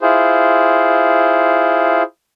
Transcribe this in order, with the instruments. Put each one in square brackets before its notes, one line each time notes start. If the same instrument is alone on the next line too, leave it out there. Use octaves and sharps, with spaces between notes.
[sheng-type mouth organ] E4 F4 G#4 C5